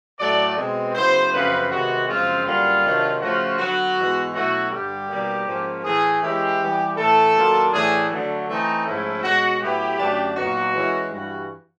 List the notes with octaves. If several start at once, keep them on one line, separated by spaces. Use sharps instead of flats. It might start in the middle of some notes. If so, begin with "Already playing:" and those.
A2 F#3 A3 D5
B2 G#3 C4
C#3 F#3 B3 E4 C5
F#2 C#3 F3 A3 C4 B4
C3 D#3 G#3 B3 F#4
F#2 C#3 F3 G#3 C4 F4
F#2 D3 G3 A#3 F4
C3 D#3 F#3 A3 D4
C#3 F3 A3 C#4 F4 F#4
D3 F#3 B3 F#4
G#2 E3 G#3 B3
B2 F#3 A3 C#4 E4 F#4
G2 D3 G3 G4
B2 G3 A#3 D#4
G#2 F3 A#3 C#4
A2 E3 A3 G#4
E3 G#3 C#4 E4 G4
E3 G3 B3
A2 E3 A3 A4
D#3 F#3 A#3 D4 F4
A2 E3 A3 D4 G#4
D3 F#3 A3
E3 A3 C4 D#4
G#2 F3 A3 C#4 E4
B2 G#3 C#4 F#4
A2 F#3 B3 E4 G4
F#2 D3 F#3 A3 D4
A#2 F#3 B3 D#4 F#4
E3 G#3 C#4 E4
G2 E3 G3 F#4